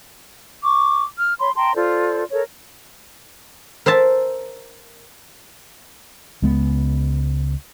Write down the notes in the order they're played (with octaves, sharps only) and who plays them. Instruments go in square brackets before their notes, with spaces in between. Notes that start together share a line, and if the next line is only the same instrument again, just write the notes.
[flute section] C#6 D6
F6
C#5 B5 C6
G5 A5 A#5 C6
F4 A4 C5 D5
A4 A#4 C#5
[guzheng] A#4 C5 E5 A5
[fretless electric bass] C#2 G#3 B3